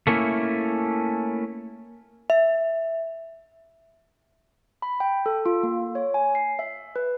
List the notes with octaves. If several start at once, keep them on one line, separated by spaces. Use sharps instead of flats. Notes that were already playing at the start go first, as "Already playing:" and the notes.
A3 A#3 C#4 E4
E5
B5
G5
A4
F4
A#3
C#5
G#5
C7
E5
B4